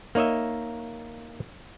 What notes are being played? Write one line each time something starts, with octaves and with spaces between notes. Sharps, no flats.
A#3 D#4 C#5 D#5 E5